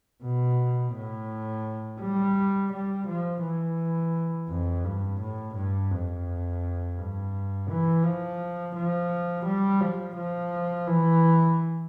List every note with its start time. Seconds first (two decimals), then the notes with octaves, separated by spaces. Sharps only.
0.23 B2
0.94 A2
2.00 G3
2.72 G3
3.08 F3
3.43 E3
4.50 F2
4.84 G2
5.20 A2
5.55 G2
5.91 F2
6.98 G2
7.69 E3
8.04 F3
8.75 F3
9.45 G3
9.81 F3
10.16 F3
10.87 E3